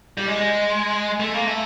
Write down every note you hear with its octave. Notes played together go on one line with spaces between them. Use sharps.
G3
G#3
A3
A#3
A3